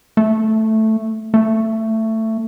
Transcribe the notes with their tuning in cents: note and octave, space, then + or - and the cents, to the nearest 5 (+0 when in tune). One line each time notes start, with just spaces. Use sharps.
A3 +0
A3 +15